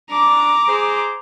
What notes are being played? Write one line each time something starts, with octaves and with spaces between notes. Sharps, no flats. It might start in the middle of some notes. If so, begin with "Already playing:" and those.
D4 A#5 D6
G#4 C5